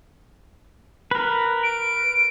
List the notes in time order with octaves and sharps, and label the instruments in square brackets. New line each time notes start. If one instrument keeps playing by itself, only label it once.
[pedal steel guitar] A#4 B4
[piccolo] D7